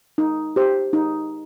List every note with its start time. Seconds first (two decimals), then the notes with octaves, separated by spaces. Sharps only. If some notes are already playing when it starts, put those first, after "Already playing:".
0.18 D#4
0.56 G4 C5
0.93 D#4